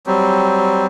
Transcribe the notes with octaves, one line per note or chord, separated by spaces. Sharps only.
F#3 G3 C4